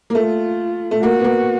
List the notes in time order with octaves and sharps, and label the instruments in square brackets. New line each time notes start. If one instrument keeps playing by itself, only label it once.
[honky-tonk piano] A#3
[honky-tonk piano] A3 [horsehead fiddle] F4
[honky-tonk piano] A3
[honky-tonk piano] A#3 [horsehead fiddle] F#4
[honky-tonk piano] B3
A#3